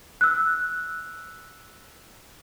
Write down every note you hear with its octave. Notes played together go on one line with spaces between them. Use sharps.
E6 F#6